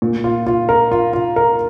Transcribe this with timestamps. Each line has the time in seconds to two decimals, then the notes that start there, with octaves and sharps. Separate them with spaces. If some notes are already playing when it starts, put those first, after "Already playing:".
0.02 A#2
0.24 F4
0.47 F4
0.69 A#4
0.92 F4
1.13 F4
1.36 A#4